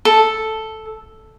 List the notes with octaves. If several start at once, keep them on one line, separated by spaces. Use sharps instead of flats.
A4